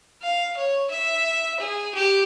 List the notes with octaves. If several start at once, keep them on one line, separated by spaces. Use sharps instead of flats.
F5
C#5
E5
G#4
G4